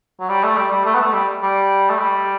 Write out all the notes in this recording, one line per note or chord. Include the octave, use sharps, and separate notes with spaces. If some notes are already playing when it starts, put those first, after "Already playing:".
F#3
G3
A3
G3
G3
A3
B3
A3
G3
G3
A3
G3